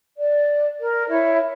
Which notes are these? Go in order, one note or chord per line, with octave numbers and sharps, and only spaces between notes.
D5
A#4
E4 C#5 E5